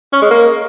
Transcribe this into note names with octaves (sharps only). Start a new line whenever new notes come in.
C#4
G#3
A#3